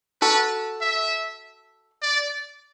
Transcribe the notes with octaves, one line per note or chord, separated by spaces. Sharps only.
F#4 A4 B4
E5
D5